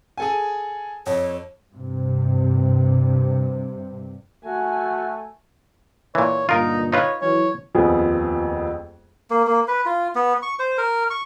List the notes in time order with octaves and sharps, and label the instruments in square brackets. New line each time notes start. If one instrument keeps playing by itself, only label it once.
[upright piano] G#4 A4 G#5
[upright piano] F2 [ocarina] C#5
[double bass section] G2 C3
[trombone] A3 [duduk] F#4 [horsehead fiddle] G#5
[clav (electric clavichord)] A#2 E3 [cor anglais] C#5
[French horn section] G2 A#2 D3 [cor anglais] D#4 [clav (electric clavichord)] F4 A#4
[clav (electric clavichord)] D#4 F4 B4 [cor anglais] C#5
[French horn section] E3 F#3 [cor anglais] C#5
[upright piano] D#1 F2 F3 B3 G#4
[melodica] A#3
A#3
B4
F4
B3
C#6
C5
A#4
C#6